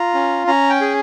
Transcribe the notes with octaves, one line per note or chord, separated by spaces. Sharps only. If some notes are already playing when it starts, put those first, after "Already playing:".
Already playing: F4 A#5
C#4
C#4 A#5
G5
G#4